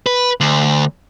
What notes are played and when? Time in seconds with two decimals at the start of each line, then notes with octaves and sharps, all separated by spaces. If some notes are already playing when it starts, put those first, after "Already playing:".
0.06 B4
0.40 D2